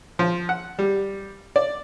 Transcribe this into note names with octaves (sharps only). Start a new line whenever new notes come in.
F3
F#5
G3
D5